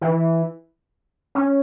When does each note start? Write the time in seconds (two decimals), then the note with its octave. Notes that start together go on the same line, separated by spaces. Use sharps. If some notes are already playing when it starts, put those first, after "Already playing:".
0.01 E3
1.35 C#4